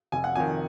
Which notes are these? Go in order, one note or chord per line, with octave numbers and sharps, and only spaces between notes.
F1 G#5
F#5
F2 D#3 G#5